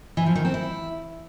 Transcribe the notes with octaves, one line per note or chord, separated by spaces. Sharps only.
E3
F3
D#3
C4
E4